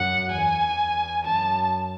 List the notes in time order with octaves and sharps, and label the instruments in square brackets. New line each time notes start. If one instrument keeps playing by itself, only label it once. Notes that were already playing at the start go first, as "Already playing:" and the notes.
Already playing: [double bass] F#2 [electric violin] F#5
[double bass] E2 [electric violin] G#5
[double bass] F#2 [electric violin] A5